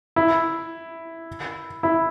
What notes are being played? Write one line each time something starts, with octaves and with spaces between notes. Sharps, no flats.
E4
E4